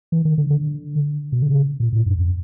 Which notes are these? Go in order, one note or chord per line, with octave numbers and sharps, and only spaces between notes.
E3
D#3
D3
D3
B2
D3
C#3
A#2
A2
F#2
F2